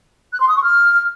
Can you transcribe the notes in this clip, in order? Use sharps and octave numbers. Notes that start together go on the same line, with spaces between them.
F#6
C6
D#6
C#6
F6